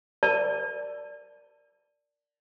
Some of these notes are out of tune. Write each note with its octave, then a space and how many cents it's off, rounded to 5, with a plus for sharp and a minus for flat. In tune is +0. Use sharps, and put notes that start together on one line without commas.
A#4 +0 D5 +0 A5 +20